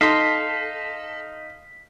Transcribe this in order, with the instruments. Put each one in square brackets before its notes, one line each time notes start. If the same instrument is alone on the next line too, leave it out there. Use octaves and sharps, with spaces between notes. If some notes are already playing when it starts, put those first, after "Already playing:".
[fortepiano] D#4 [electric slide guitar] A4 [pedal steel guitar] F5 C6 [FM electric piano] B6